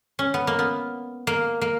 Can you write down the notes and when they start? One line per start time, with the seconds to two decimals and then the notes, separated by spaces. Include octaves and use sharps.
0.19 C#4
0.34 B3
0.47 A#3
0.59 B3
1.27 A#3
1.61 A#3